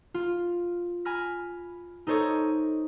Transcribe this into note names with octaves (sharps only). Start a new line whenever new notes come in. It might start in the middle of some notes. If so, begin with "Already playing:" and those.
F4
G#5 B5 F6 A#6
D#4 A4 C5 C#5 D#5